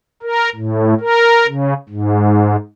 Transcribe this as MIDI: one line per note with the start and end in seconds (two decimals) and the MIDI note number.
0.22 0.50 70
0.55 0.94 45
1.00 1.47 70
1.47 1.74 49
1.89 2.56 44